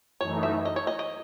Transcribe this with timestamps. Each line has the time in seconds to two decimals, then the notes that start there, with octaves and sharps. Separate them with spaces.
0.21 F#2 E3 A3 D#4 C#5
0.43 E5
0.65 D#5
0.76 C#5
0.87 D#5
0.99 D#5